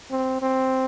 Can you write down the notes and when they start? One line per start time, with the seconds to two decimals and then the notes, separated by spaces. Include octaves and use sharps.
0.11 C4
0.42 C4